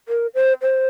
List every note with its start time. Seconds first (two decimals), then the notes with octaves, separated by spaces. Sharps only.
0.08 A#4
0.35 C5
0.62 C5